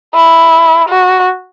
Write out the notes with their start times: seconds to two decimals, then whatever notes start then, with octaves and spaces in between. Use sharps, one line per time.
0.15 E4
0.89 F#4